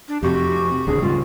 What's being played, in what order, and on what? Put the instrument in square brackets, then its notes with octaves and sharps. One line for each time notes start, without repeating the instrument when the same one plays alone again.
[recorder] D4
[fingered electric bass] F2 C3 [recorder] F#4 [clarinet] G4
[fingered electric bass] D#1 C#2 D3 [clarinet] G#4
[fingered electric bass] G#2 C#3 G3 [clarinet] F4